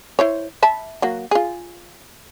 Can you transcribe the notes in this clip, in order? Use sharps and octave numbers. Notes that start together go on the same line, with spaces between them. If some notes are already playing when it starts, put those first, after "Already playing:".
E4 C5 C#5
E5 A5 B5
F#3 A#3 F#4
F4 G#4